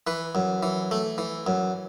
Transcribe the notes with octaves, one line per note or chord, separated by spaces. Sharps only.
E3 B4
F#2
E3
A3
E3
F#2